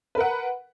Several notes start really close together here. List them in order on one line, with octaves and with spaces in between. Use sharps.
B4 A#4 F#5